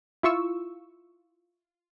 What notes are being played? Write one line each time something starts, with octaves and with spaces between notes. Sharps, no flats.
E4 F4 C#6 E6